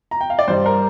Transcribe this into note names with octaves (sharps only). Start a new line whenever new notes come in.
A#5
G5
F5
D5
G2 G3 C5
A#4